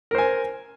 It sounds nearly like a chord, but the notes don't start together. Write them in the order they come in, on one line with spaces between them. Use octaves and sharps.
A#4 C5 G#5